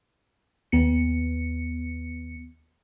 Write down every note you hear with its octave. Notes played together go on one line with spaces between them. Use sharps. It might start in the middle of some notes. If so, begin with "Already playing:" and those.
D#2 B3 C#7